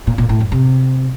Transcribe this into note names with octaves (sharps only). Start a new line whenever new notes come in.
A#2
A#2
A2
F#2
C3